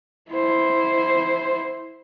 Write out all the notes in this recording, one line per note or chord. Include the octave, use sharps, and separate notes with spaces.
E4 C5